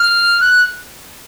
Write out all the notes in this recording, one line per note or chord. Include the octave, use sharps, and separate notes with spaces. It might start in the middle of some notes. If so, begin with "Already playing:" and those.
Already playing: F6
F#6